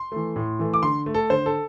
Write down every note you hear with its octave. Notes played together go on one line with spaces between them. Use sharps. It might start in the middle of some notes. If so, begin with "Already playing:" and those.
Already playing: C6
E3 A3
A2
E3 A3
D6
D3 C6
A3
A4
D3 C5
A4